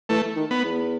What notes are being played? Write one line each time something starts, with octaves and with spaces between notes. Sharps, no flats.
E3 A3
D#3
B3
E2